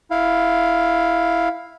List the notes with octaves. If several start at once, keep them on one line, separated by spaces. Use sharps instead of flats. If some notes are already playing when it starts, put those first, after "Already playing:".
E4 F5